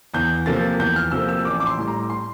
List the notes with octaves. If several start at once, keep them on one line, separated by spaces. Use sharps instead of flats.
E2 G6
C3 F3 A#3 A6
E2 G6
F6
C3 F3 A#3 E6
E6
A1 D6
D6
C6
A2 G3
A#5
C6